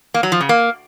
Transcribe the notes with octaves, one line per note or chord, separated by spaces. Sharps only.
A#3
F#3
F3
C#3
A#3